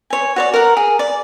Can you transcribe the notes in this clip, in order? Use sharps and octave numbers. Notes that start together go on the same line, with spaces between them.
C#5 G#5
F#4 C#5 D5
A#4 F#5
G#4
D5